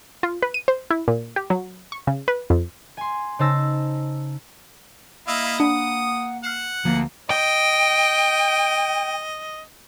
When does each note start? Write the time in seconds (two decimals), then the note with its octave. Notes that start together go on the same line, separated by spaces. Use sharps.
0.23 F4
0.42 B4
0.54 D#7
0.68 C5
0.90 E4
1.08 A#2
1.36 G4
1.50 F#3
1.92 C#6
2.07 C#3
2.28 B4
2.50 F2
2.97 G#5 C6
3.39 C#3 D#4 C5 A5 E6 A#6
5.28 A#3 E4 D#5 F5 E6 A#6
5.60 D4 F#5 B5 D#6
6.44 F#5 F6 C7 E7
6.85 D2 F3 A#3
7.30 D#5 G5